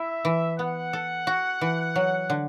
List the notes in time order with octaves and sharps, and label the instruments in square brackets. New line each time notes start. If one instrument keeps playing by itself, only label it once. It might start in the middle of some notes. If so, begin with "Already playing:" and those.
Already playing: [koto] E4 [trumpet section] E5
[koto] E3
[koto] B3 [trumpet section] F#5
[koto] A4
F#4
E3
F#3
D3